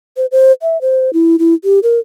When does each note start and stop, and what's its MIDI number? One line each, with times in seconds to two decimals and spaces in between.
0.17 0.26 72
0.32 0.52 72
0.62 0.80 76
0.81 1.10 72
1.13 1.36 64
1.39 1.54 64
1.64 1.79 67
1.83 1.99 70